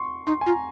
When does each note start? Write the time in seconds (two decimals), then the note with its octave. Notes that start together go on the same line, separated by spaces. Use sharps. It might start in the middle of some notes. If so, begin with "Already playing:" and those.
Already playing: C6 C#6
0.27 D#4 C6
0.41 G#5
0.46 F4 A#5